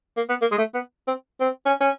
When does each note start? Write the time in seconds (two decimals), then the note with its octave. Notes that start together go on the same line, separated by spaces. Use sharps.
0.17 A#3
0.29 B3
0.42 A#3
0.52 G#3
0.58 A3
0.74 B3
1.08 C4
1.41 C4
1.66 C#4
1.81 C#4